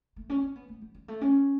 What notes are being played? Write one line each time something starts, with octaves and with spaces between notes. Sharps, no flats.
A3
C#4
C#4
B3
A3
G3
G3
A3
C#4